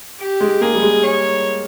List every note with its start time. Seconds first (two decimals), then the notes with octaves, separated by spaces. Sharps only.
0.20 G4
0.41 G#3
0.61 A#3 G#4
0.75 G3
0.82 G#3
1.03 C#5